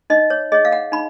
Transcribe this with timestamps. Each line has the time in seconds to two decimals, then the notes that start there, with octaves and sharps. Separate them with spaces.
0.10 D#4 D#5
0.30 C#5
0.52 G#4 C#5 D#5
0.65 F5
0.72 F#5
0.92 D#4 B5